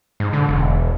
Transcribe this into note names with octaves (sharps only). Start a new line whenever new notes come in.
G#2
D3
E1